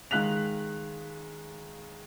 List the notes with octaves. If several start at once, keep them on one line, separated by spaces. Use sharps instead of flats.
D#3 G#3 F5 F#6 B6 F7